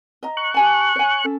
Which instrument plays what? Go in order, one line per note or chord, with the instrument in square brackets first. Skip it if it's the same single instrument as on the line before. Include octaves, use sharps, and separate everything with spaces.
[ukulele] D#5 A#5
[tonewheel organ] C#6 F#6
[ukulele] G4 G#5 A5
C#5 G#5
C#4 A4